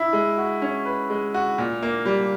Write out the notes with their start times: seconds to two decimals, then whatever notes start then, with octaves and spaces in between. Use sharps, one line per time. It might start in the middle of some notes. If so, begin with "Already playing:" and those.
Already playing: E4
0.13 G#3
0.38 F#4
0.62 C#4
0.85 B4
1.10 G#3
1.34 F#4
1.58 A#2
1.83 A#3
2.06 G3